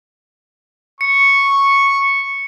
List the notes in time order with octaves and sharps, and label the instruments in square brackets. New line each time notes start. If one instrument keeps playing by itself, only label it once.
[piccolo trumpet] C#6 [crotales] C#7